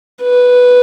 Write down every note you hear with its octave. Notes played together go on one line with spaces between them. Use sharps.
B4